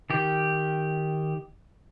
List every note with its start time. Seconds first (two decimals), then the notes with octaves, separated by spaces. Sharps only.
0.10 D#3 G4